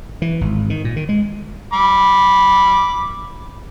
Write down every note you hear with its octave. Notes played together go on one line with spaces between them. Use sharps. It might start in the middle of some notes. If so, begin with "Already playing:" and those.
E3
G#1
D#3
A#2
D#3
G#3
B5 D6